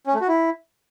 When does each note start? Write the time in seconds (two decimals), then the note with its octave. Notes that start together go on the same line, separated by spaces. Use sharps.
0.07 C#4
0.14 A3
0.21 F#4
0.28 E4